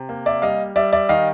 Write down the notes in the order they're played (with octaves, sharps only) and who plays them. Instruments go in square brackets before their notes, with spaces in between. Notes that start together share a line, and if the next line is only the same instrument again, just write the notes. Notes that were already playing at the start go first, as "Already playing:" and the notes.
Already playing: [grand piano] C3
A#3
D5 E5
G3 D#5 F5
G3 D5 E5
D5 E5
D#3 D#5 F5